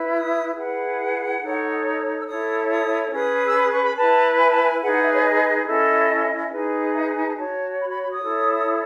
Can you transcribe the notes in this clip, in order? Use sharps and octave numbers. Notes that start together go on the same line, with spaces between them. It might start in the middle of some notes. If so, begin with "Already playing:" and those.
Already playing: E4 B4
D#6
E4 G#4 B4 F#5
D#4 A4 C#5
E6
E4 A4 C#5 D#6
D#6
C#4 G#4 B4 D#6
E6
D#6
C#6
B5
E4 B4 A5
G#5
A5
G#5
D#4 G#4 B4 F#5
F#5
E5
C#5
E5
D#5
C#4 E4 A4 D#5
D#4 G#4 B4
E5
G#5
G#5
A5
F#4 C#5 A5
B5
B5
B5
D#6
E4 A4 C#5